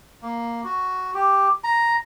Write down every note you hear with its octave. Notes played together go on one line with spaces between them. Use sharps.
A#3
F#4
G4
A#5